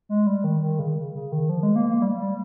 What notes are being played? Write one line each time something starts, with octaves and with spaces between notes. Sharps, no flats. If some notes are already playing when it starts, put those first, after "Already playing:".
G#3
G3
D#3
D#3
C#3
C#3
D#3
F3
G#3
A#3
A#3
G3
G3